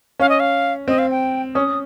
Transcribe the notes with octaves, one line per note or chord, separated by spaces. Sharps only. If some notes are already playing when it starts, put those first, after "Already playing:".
C#4 F5
D#5
F5
C4 D#5
F5
G5
C#4 D#6